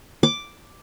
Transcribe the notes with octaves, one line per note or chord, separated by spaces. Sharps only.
D6